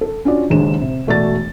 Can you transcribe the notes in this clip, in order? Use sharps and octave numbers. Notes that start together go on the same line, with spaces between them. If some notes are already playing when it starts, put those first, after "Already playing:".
A4
C#4 D4 F4 F#4 D5
F#1 D#2 G#3 D4 E7
C3
E1 A3 F#4 D5 A6